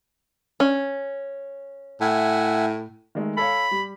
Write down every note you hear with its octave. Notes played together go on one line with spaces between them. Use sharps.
C#4
A2 E5 F#5 G#5
D#3 G#3 A3
A4 C#5 F5 B5
G3